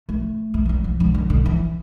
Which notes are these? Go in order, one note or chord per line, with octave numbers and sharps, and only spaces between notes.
A3
A3
A3
G3
F3
D3
D3
D3
E3